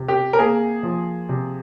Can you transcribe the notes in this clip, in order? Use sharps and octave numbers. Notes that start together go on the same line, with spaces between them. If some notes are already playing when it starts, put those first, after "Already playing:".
Already playing: C3
G4
A#4
A#3 G#4
F3
C3